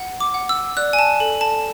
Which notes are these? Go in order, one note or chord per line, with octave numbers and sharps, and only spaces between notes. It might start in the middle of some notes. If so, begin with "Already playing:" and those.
Already playing: F#5
D6
F#5
E6
D5 F#6
G#5
A5
A4
A5